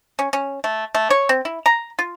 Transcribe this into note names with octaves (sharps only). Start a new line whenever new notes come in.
C#4
C#4
A3
A3
C#5
C4
E4
A#5
F4